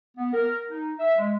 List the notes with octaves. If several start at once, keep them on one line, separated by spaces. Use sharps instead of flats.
B3
A#4
D#4
E5
G#3